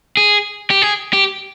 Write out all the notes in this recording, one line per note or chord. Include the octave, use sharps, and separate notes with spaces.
G#4
G4
G#4
G4